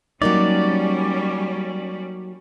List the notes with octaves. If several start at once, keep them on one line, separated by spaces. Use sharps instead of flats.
F#3 G3 A#3 C#4 D#4 D5